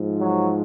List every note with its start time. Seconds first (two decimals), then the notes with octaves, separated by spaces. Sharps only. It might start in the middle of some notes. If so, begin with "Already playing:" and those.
Already playing: G#2 F3
0.18 F#3